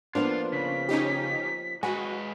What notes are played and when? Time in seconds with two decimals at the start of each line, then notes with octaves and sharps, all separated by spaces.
0.15 F3 A#3 B3 D4 F4
0.52 C#3 B6
0.89 C#4 D#4 G4
1.83 G#3 F#4 B4 G#5